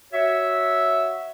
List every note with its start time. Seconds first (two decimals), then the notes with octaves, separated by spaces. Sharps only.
0.13 F#4 C#5 E5